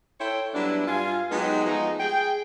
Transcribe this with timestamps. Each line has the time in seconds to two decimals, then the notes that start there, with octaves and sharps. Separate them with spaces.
0.21 E4 A4 C5 C#5 G5
0.55 F#3 G3 B3 D4 E4
0.87 G2 F4 G#5
1.31 F#3 G#3 B3 D#4 G4 D#5
1.66 F3 G#3 A3 B3 D#4
2.00 G#4 G5